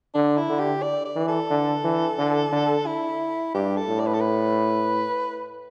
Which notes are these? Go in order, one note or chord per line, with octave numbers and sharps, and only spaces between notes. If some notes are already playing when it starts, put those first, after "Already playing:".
D3 D4
E4
D3
G4
D5
D5
E3
A4
D3
E3
D3
D3
E4
G2 G4
A4
A2
D5
B4
A4
B4